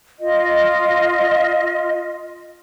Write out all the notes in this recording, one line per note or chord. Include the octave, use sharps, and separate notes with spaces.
F4 D#5